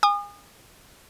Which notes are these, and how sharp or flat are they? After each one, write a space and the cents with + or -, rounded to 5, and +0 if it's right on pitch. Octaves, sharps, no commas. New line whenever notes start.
G#5 -30 D#6 -35